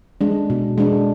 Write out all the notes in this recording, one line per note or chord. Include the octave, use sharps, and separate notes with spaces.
G#3 D4
B2
G#3 D4